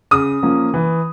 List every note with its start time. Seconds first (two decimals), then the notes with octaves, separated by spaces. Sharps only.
0.11 C#3 D#6
0.43 F3 A#3 C#4
0.74 E3